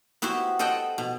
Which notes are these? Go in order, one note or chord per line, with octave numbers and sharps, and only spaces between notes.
B3 E4 F#4 G4 C5
A4 C5 D#5 F#5 G5
B2